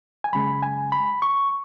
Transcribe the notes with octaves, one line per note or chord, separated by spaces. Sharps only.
G#5
F#2 C#3 G#3 B5
G#5
B5
C#6